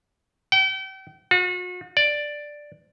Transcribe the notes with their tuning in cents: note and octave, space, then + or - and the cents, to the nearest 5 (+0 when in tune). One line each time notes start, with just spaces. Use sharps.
G5 -35
F#4 -40
D5 +5